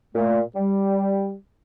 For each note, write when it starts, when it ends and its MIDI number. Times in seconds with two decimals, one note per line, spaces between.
0.15 0.40 46
0.15 0.40 57
0.56 1.36 55